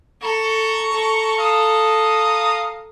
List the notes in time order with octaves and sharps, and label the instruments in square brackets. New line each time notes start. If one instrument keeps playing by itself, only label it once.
[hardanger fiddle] A4 [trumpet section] A#5 C#6
[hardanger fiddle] A4
[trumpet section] F5 A#5 D#6